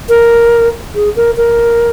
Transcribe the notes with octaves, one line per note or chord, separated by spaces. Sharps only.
A#4
G#4
A#4
A#4